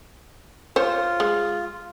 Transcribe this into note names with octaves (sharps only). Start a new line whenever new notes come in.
F4 C5 C#5
G#3